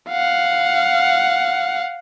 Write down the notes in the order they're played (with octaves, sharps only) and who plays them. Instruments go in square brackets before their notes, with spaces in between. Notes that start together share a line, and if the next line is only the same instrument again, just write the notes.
[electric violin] F5 F#5